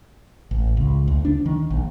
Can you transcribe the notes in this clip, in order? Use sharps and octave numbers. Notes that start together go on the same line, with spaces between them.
A1
C#2
D2
D4
D#3
A#1